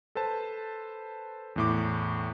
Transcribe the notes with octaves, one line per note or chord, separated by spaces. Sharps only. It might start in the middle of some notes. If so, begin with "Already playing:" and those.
A4 B4 C5 A5
E2 A2 D6